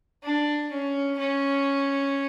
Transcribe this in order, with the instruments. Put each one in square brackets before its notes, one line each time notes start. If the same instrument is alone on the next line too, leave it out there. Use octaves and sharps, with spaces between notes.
[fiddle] D4
C#4
C#4